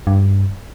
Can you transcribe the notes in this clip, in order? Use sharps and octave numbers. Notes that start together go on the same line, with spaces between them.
G2